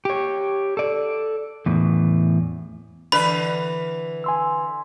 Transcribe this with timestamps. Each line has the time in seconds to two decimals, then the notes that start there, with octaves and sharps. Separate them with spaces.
0.05 G4 C#5
0.77 A4 D5
1.66 E2 A2
3.12 D3 E3 B4 B5
4.24 G#5 C6 E6